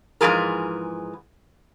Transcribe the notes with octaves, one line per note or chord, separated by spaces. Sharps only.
G#2 E3 F3 G#4 A#4